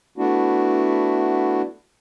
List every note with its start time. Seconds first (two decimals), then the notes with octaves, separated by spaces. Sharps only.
0.18 A3 B3 D4 E4 F#4